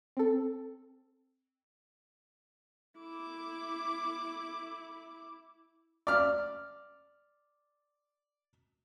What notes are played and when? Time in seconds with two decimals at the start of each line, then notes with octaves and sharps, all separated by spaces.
0.17 C4 A4
2.99 E4 D6
6.07 D5 F6